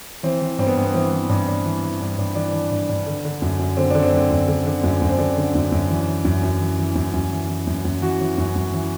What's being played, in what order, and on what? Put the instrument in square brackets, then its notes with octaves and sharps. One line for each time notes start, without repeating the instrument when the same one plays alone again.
[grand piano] E3 C4
E3
G2 C4
B3
G2
B3
E3 C4
E3
G2
G2
E3
E3
G2
G2
E3 D4
E3
G2
G2
D3
D3
F#2
F#2
D3 C4
D3 D4
C4
F#2
F#2
D3
D3
F#2
F#2
C4
D3 D4
D3
F#2
F#2
E3
E3
F#2
F#2
E3
E3
F#2
F#2
E3
E3
F#2
F#2
E3 F#4
E3
F#2
F#2
E3